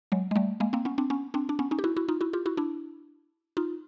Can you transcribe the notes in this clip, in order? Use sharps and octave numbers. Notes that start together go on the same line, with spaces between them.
F#3 G#3
G#3
G3 A3
G#3 A#3
A#3 C4
B3 C#4
C4 D4
B3 C#4
C4 D4
D4
B3 C#4
C#4 D#4
G4
E4 F#4
E4 F#4
D#4 F4
E4 F#4
F4 G4
E4 F#4
D4 E4
D#4 F4